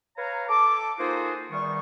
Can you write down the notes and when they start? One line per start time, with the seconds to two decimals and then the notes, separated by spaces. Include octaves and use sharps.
0.17 B4 C#5 F5 G#5 A#5
0.47 A4 A5 D6
0.98 A#3 D#4 F4 F#4 G#4 C5
1.51 E2 D#3 G3 B3 D#4 C#6